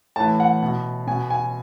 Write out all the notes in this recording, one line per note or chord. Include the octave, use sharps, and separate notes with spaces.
A2 E3 A5
F#5
B2
B2 G#5
G#5